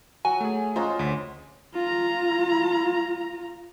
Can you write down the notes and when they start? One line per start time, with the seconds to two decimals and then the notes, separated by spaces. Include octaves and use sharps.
0.25 F#3 F#4 G#5
0.40 A3 G#4
0.76 G#3 C#4 F4 C5 A#5 C6
0.99 D2 B6
1.74 F4 A#5